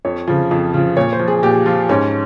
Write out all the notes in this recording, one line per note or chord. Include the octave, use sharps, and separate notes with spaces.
F2 C#5
C#3 F3
F2
C#3 F3
A#2 C#5
C5
F3
G#4
A#2 G4
F3 F4
G#2 C#4